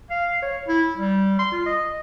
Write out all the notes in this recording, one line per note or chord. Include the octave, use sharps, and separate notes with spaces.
F5
C#5
E4
G3
C6
F4
D#5